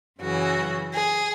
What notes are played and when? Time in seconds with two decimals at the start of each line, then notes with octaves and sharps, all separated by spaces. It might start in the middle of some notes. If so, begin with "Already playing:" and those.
0.20 F#2 C#3 E3 F#4
0.93 G#4